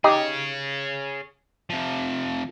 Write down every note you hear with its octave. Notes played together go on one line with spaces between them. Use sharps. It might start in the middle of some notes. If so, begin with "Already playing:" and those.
D#4 G4 G#4 C#5 D#5
C3 F3